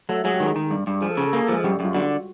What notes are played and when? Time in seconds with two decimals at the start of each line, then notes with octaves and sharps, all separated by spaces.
0.09 F#3 A3 A4
0.24 F#3 G#3 G#4
0.34 G4
0.40 D#3 G#3 G#4
0.56 D#3
0.71 G2
0.87 G2
1.01 F3 G#4
1.10 A4
1.17 C#3 G#4
1.27 A4
1.33 A#3 G#4
1.43 A4
1.48 F3 G#3 G#4
1.64 F#2 G3 G4
1.80 F#2 F4
1.95 D3 F#4